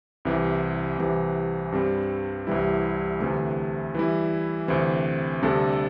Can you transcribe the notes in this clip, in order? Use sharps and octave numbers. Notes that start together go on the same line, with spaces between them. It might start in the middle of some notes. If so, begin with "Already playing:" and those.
C2 C3 E3
C2 C3 E3
G2 G3 C4
C2 C3 E3 G3 E4
D2 C3 E3 A3
E3 G3 E4
D2 C3 E3 C4
D2 C3 G3 D4 A4